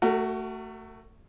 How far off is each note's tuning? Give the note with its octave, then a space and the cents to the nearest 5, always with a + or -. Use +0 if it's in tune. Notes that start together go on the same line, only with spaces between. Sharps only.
A3 +15 F#4 +20 A#4 -35